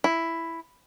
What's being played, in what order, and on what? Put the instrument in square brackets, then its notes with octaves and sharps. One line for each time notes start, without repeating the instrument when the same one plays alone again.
[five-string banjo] E4